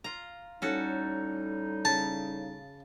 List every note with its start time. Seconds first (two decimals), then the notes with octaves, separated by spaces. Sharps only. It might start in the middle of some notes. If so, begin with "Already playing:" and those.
0.04 F4 A#5
0.62 A2 G3 C#4 D#4 F#4 A4
1.85 C#3 A5